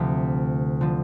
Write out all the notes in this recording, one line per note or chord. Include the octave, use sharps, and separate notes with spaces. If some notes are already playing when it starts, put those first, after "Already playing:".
Already playing: D2 C3 F3 E5
D3 F3